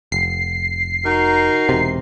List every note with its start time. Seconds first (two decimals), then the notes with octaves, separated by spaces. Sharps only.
0.12 F1 C7
1.05 D#4 F#4 A#4
1.69 E1 C3